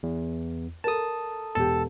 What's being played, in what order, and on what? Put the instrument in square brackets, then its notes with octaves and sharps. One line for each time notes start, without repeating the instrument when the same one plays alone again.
[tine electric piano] E2
[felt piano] A4 A#4 [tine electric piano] A5 D#6
[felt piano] E1 G4 [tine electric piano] A4 A5